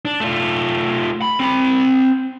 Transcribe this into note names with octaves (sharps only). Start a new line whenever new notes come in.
D4
A3 F4
B5
C4 B5